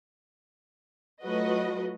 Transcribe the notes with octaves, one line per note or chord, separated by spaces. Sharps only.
F#3 A3 F4 F#4 B4 D#5